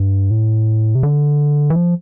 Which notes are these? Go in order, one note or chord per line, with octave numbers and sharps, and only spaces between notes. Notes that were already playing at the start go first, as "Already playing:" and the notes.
Already playing: G2
A2
C3
D3
E3
F3